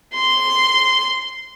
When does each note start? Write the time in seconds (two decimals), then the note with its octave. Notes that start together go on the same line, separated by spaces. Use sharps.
0.14 C6